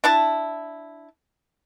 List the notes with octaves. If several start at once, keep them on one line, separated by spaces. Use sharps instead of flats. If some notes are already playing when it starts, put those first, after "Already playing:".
D4 E4 A5